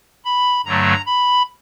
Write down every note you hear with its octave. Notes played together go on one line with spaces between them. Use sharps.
B5
G2 D3 F#3 A3 A#5
B5